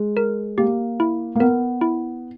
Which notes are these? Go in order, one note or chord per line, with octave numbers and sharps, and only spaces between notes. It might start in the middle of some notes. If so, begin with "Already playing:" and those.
Already playing: G#3
A#4
A#3 G4
E4
A#3
B3 A#4
E4